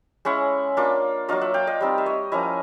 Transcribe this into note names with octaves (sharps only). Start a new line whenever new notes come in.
G#3 C#4 E4 E5 F#5
A#3 D4 F4
F#3 A#3 D4 F4 D#5 F5
E5 F#5
F5 G5
D#5 F5
G3 C4 D#4
E5
C#5 D#5
F3 A#3 C#4 E4 D#5 F5